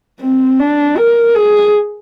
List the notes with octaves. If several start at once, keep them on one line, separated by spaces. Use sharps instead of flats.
C4
D4
A#4
G#4